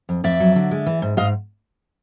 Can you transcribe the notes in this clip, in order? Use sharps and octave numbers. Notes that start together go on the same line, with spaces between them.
F2
F2 D5 E5
F#3
D3
G#3
E3
G#2
G#2 D#5 F5